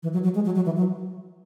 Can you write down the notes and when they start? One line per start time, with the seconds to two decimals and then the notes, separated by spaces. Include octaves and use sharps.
0.03 E3
0.13 F#3
0.24 F#3
0.35 G#3
0.45 F#3
0.55 F#3
0.65 E3
0.76 F#3